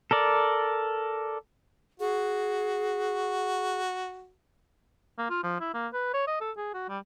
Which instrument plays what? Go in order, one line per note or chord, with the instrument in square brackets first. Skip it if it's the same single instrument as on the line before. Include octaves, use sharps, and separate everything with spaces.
[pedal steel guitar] A4 A#4 D5
[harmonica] F#4 [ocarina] G#4
[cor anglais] A#3
F4
F3
E4
A#3
B4
C#5
D#5
A4
G#4
F#4
G3